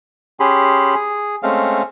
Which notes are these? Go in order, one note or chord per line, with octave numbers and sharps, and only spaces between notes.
C#4 G4 G#4 B5 C6
G#4
G#3 A3 C4 C#4 F5